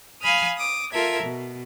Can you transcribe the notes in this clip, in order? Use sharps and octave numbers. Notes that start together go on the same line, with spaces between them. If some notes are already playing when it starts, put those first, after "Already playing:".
F5 G#5 B5 D#6 F6
D6 D#6
F4 A4 A#4 E5 G#6
B2